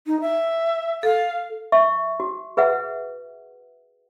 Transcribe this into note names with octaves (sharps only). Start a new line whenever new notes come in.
D#4
E5
A4 F5
E5 C#6
F#4
G#4 B4 E5 F#5